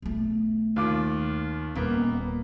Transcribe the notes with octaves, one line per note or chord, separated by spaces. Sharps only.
B1 A3
D#2 F4 D6
D#1 A#3 B3